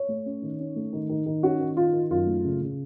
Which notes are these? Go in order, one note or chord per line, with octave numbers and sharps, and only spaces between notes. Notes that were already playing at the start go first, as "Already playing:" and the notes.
Already playing: C#5
A3
C#4
D#3
C#4
A3
D#3
D#3
D#3
C#4 F#4
D#3
D#3 F4
D#3
F#2 F4
A3
C#3
C#3